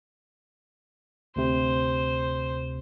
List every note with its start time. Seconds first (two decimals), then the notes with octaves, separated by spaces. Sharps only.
1.36 D2 C3 C5